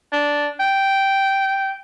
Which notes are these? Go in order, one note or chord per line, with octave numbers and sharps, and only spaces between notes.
D4
G5